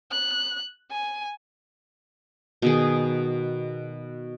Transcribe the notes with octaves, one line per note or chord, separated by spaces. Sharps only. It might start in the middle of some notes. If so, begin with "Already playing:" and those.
F#6
G#5
B2 D#3 G#4